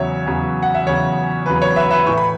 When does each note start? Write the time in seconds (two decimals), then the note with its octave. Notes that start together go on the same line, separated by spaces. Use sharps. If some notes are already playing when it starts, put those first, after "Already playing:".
Already playing: E2 C#3 F#3 C#5 E5
0.26 E2 C#3 F#3
0.63 F#5
0.75 E5
0.86 E2 C#3 F#3 C#5
1.46 E2 C#3 F#3 B4
1.62 C#5
1.76 B4 E5
1.91 B4 E5
2.07 A2 E3 C#6
2.17 B5